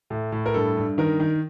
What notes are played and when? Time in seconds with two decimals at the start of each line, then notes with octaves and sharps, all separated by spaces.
0.10 A2
0.32 A2
0.46 A#4
0.54 G2 A4
0.77 G2
0.98 D#3 A#4
1.20 D#3